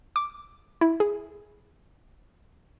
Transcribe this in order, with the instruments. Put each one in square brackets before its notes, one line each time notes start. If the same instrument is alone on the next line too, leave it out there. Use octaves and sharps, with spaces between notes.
[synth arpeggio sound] D6
E4
G#4